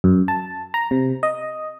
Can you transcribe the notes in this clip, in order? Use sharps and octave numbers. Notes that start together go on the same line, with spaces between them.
F#2
A5
A#5
C3
D#5